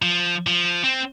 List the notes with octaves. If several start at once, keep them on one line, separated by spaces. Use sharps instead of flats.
F3
F3
C4